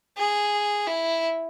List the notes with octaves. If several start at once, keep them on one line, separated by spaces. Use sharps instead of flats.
G#4
E4